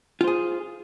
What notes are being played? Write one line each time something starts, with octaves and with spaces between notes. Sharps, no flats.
F4 G#4 C5